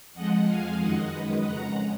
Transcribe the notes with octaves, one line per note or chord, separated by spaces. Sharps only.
F2 F3 G#3 D#5 F#5
F5 G#5
F#2 D#3 G#3 D#5 F#5
B4 D#5
F2 C#3 G#3 F#5 A#5